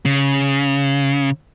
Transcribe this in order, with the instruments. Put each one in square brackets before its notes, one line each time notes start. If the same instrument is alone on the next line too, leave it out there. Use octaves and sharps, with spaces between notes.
[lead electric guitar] C#3